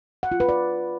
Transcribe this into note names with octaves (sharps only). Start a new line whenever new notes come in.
F#5
F4
B4
D5